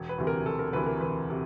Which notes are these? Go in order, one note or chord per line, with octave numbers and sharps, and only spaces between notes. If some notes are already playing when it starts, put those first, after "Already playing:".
Already playing: E1
B4
D2 C3 E3
A#4
E1 A4
A#4
D2 C3 E3 B4
A#4
E1 B4
C3